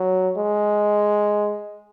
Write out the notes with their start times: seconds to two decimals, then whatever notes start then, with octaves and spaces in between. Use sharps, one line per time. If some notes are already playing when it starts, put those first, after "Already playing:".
Already playing: F#3
0.36 G#3